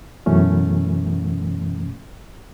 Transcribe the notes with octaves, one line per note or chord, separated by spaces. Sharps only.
F#2 B2 E3 A3 C#4